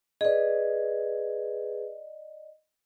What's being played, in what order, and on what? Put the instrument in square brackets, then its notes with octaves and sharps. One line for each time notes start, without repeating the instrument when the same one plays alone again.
[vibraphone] G#4 B4 [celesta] D5 D#5